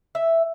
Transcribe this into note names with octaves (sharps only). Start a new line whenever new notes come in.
E5